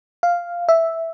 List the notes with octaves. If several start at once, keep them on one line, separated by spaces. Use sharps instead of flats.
F5
E5